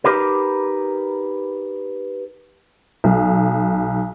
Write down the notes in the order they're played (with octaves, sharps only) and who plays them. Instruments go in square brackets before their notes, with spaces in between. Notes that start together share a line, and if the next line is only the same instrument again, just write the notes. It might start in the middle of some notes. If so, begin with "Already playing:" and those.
[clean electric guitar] D#4 G4 A#4 B4
[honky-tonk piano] B1